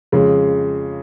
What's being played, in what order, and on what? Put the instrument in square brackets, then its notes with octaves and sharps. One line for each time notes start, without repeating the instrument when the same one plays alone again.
[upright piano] F2 C#3 G#3